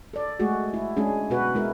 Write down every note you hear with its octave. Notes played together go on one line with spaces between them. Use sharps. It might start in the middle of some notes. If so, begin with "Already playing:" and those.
A4 D5
G#3 A3 F#4 G#4
E4
G#3 C#4 D4 G#4
B2 F#4 B4
G#3 E4 A#4